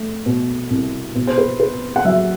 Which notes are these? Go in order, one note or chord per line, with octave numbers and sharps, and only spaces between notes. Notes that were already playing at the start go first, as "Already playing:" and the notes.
Already playing: A3
B2
C2
B2
C5
B4
B3 B4
F#5
F#3 E5